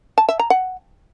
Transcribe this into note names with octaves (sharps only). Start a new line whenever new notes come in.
A5
E5
A#5
F#5